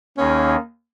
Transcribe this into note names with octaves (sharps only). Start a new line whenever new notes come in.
D#2 D#3 A#3 C#4 D#4 G#4